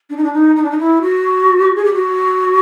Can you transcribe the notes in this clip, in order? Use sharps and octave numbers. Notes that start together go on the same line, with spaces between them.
D4
D#4
D4
D#4
D#4
D4
D#4
E4
F#4
G#4
G4
F#4